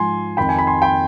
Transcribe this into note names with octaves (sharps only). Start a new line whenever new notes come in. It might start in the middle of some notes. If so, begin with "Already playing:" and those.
Already playing: G#2 F3 G#5 C6
F2 D#3 G5 B5
G#5
B5
G#5 C6
G5 B5